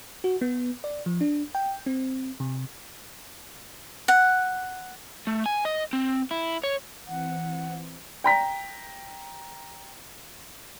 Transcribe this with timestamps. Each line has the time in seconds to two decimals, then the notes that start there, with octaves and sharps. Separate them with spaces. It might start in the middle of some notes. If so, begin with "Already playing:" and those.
0.24 F#4
0.41 B3
0.84 D5
1.06 F3
1.21 D4
1.55 G5
1.86 C4
2.40 C3
4.08 F#5
5.27 A3
5.46 G#5
5.65 D#5
5.93 C4
6.31 E4
6.63 C#5
7.07 E3 C4 F#5
8.24 G5 A#5 B6